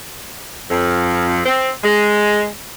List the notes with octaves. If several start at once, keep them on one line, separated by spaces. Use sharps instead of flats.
F2
C4
G#3